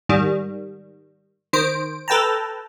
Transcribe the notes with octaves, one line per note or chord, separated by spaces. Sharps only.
G#2 D#3 G3
D#3 C5 D7
A4 B4 G5 A5 A#5